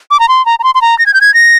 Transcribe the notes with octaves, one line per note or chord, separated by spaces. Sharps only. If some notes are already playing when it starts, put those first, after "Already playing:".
D6
A#5
C6
A#5
A#5
C6
C6
A#5
A#6
G#6
G6
G#6
A#6